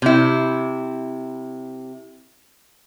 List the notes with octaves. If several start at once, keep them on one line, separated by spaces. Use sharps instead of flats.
C3 E4